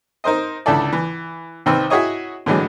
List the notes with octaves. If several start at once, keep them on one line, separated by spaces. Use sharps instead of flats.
D#4 A#4 C5 D#5
C#2 D3 E4 A4 D5
E3
C2 D#3 C4 B4 E6
E4 F#4 G#4 C#5 D#5
A2 D3 E3 F#3 G#3